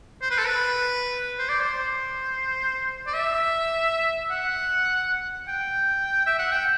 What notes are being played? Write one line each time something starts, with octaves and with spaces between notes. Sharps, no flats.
C5
B4
A4
B4
C5
D5
C5
D5
E5
F#5
G5
E5
F#5
G5